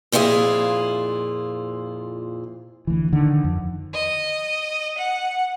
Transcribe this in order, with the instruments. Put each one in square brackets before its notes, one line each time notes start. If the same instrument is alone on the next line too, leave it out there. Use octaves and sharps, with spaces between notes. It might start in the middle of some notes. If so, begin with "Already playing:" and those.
[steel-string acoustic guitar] F2 A#2 E4 F4 G#4
[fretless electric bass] D2 E3
D3 D#3
F2
[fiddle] D#5
F#5